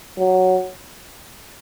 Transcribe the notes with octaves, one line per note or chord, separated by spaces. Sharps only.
F#3